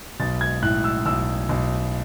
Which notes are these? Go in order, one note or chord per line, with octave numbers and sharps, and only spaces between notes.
B1 A6
G#6
A2 F#6
E6
B1 E6
B1